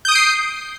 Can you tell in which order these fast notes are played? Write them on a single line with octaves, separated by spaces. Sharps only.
G6 D#6 D7 C7